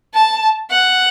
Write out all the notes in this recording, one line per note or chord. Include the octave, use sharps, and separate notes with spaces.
A5
F#5